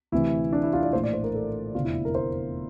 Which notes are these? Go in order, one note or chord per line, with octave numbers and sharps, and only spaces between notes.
D2 C3 E3 E4
D4
E4
F4
D5
A#1 A2 E3 C5
D5
C5
A#4
A4
F1 E2 D3 F4
E4
A#4
C5